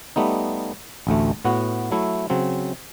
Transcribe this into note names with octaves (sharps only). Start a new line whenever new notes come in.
G3 A3 B3 D#4
A1 D2 A3
A2 B3 F#4
F#3 A3 E4
C#3 F#3 C4